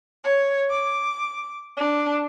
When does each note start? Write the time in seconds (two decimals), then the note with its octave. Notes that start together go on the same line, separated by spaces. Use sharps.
0.23 C#5
0.70 D6
1.77 D4